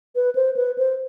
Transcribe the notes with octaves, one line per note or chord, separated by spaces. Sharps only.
B4
C5
B4
C5